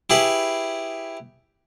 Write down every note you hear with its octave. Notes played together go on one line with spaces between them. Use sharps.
E4 G4 G#4 B4